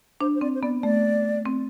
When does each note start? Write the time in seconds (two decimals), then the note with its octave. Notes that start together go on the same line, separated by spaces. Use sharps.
0.21 D4 C5
0.35 C5
0.41 C4 D5
0.55 C5
0.62 B3 D5
0.83 A3 D5
1.46 C4